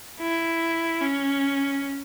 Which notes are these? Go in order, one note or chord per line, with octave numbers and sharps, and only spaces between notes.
E4
C#4